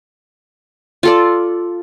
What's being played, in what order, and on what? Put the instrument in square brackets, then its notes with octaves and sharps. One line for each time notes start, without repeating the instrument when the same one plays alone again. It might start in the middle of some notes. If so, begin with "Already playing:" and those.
[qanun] F4 A4 D5